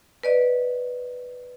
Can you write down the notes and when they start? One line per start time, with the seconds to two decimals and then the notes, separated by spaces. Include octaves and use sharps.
0.23 B4 D5 D#5